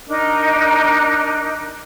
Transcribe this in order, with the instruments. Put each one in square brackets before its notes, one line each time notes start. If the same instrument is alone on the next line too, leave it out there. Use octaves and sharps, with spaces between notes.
[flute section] D4 D#4 A#4 D#5